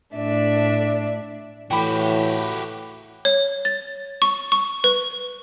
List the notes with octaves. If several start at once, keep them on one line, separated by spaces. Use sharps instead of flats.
A2 D4 D5 E5
A2 E3 F#4 G4 G5 B5
C#5
A6
C#6
C#6
B4